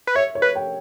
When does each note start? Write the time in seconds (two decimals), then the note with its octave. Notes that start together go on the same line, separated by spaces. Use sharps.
0.07 B4
0.15 C#5 E5
0.35 C#5
0.42 B4
0.55 G5